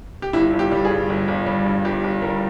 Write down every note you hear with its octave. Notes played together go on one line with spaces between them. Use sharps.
G4
G1 E4
G1
G4
G3
G#4
G2
G1
G1
G3
G2
G1 G4
G1
G3 A#4